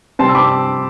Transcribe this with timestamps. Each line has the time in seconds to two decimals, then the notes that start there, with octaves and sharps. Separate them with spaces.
0.19 C3 G3 C4 A5 C6
0.28 E6
0.35 B5 D6